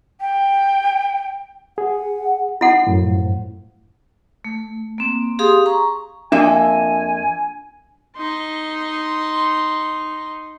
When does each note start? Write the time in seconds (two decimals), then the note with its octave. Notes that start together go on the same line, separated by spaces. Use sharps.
0.21 G5
1.78 G#4 F#5
2.61 D#4 E4 F#5
2.87 F#2 A2 F3
4.44 A3
4.98 A#3 C4
5.39 G4 G#4 F5 C6 D#6
5.66 A#5 C#6
6.32 F2 A#3 D4 E5 G#5
8.17 D#4 C6